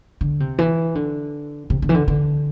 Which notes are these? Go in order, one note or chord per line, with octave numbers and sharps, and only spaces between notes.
D3
C3
E3
D3
C3
D3
E3
D3
D3